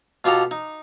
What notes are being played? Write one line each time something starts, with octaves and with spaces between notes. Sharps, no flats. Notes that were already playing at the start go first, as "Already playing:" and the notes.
B2 F4 G4 A4 A#5
D#4